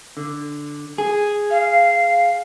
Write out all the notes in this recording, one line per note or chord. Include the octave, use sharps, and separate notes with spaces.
D3
G#4
F5